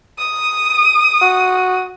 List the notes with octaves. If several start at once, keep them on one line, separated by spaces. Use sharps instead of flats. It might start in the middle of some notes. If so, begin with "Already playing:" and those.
D#6
F#4